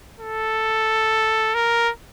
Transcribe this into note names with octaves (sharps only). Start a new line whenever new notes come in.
A4
A#4